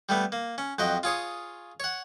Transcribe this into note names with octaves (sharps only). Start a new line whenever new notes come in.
G3 A3 B3
A#3
C#4
F2 F#3 D#5 G5
F4 G#4 C#5 D#6
C#5 F#5